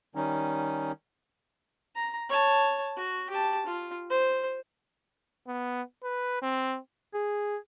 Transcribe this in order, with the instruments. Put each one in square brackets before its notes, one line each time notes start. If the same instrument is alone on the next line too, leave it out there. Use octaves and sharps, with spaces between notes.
[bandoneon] D#3 G3 C#4 D#4
[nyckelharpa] A#5
C#5 A5
F#4
G4 A5
F4
C5
[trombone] B3
B4
C4
[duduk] G#4